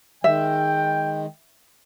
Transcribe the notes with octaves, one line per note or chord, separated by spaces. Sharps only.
D#3 G#3 E5 G5